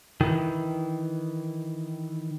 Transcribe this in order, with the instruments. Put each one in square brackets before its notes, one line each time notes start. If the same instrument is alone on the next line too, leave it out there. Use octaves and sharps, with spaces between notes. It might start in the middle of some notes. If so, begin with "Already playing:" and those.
[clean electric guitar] D#3 E3